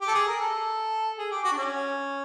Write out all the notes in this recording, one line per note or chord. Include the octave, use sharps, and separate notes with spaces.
G4
A4
G#4
A#4
A4
G#4
G4
F#4
D4
C#4